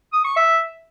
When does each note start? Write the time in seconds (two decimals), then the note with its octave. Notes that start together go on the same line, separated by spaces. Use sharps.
0.13 D#6
0.25 C#6
0.36 E5